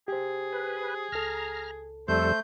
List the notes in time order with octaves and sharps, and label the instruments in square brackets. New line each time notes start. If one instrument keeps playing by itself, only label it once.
[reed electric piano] G4 C5 [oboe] G#4
[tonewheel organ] B4
[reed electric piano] C#2 A4 [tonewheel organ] A#5 F6
[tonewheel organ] F2 G3 A4 [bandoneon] A3 G6 [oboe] C5